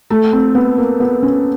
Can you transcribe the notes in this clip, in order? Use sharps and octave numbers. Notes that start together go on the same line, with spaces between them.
A3
C4
B3
A#3
B3
C#4